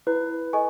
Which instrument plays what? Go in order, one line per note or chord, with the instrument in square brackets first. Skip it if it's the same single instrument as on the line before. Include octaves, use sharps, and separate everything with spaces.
[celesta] E4 [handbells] B4
[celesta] A4 D#5 G#5 C#6